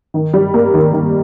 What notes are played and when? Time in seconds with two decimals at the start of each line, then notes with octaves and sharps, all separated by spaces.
0.14 D#3
0.33 G3
0.54 A#3
0.74 D#3
0.93 D#3